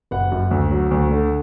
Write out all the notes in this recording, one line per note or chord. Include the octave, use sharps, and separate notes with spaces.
F#1 F#5
F#2
D2
F#3
D2
D3